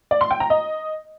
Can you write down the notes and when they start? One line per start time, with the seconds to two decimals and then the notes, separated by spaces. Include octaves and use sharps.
0.11 D5
0.21 C6
0.31 G5
0.40 A#5
0.50 D#5